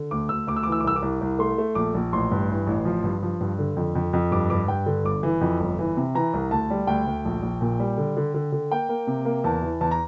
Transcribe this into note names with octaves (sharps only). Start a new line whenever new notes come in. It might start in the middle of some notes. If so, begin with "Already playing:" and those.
Already playing: D3
D2 D6
D2 E6
D2 D6
E6
D6
E3
E6
D6
C2 E6
D6
C2
C2
A3 C6
A3
A#1 D6
A#1
A1 C6
G2
E3
A1
F3
G2
F3
G2
D3
F2
F2
F2
G2 D6
G2 D6
G2 G5
D3
G1 D6
E3
F2
G1
E3
C3
E3 A#5
C2
D2 A5
G3
D2 G5
D2
A#1
A#1
A#2
G3
D3
D3
D3
D3
A#3 G5
A#3
C3
A#3
E2 A5
E3
E2 A5
A#5